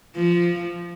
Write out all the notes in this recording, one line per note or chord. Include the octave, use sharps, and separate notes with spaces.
F3